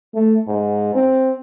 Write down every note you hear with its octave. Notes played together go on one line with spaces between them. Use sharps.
A3
G#2
C4